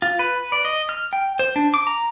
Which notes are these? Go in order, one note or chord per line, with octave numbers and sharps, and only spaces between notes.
F4
B4
D5
D#5
F6
G5
C5
D4
D6
A#5